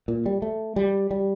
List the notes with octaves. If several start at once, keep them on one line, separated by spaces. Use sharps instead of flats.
A#2
G3
A3
G3
G3